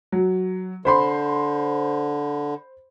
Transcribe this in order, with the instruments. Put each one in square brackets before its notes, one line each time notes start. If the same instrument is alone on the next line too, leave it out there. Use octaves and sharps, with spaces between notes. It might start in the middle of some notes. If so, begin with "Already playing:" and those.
[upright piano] F#3
[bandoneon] D3 [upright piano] C5 B5 C6